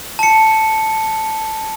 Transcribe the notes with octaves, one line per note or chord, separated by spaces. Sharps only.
A5 C#7